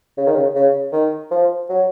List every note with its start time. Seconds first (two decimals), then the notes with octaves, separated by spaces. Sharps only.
0.18 C#3
0.27 D#3
0.36 C#3
0.55 C#3
0.93 D#3
1.31 F3
1.69 F#3